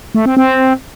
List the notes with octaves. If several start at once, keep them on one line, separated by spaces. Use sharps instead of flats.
A3
C4
C4